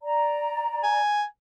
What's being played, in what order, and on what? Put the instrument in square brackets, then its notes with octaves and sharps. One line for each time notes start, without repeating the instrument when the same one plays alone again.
[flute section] D5 A#5
[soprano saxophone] G#5